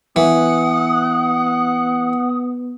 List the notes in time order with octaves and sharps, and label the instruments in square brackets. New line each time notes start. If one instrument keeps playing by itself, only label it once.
[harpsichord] E3 [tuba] B3 [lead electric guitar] F#5 [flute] D#6